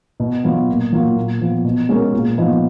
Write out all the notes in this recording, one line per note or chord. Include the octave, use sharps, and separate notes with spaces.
B2
F#3 B3 F4
A#2
F#3 A#3 F4
A#2
F3 B3
B2
G#3 C#4 F#4 A#4
A#2
F3 B3 D#4